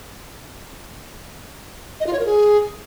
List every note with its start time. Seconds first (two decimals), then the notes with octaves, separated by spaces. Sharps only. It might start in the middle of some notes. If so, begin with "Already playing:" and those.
2.00 D#5
2.07 F4
2.13 C#5
2.19 A#4
2.26 G#4